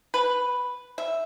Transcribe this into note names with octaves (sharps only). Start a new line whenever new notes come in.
B4
E5